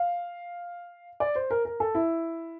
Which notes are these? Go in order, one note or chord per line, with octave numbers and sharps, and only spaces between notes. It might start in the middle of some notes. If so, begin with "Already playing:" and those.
Already playing: F5
D5
C5
A#4
A#4
A4
E4